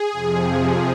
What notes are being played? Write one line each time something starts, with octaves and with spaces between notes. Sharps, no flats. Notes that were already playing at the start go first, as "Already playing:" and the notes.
Already playing: G#4
F2 C3 F3